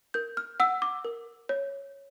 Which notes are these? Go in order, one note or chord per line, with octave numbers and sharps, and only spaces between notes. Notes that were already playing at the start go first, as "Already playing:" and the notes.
A#4 G6
F6
F#5 E6
D6
A#4
C#5